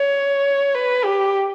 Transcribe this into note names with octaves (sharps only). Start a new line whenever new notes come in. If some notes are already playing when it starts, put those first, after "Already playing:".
Already playing: C#5
B4
G4